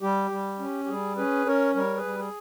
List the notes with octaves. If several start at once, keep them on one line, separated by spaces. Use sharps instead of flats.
G3 G4
G3
C#4
G4
G3 G#4
C#4 G#4 B4
C#4 A#4 C#5
G3 A#4 C#5
G#4 B4
G3
G#4